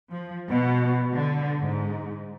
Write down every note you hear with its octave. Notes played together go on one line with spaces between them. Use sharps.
F3
B2
D3
G#2